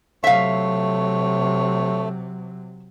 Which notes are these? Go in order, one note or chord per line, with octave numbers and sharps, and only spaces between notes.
C3 F#3 A3 C#5 E5 F5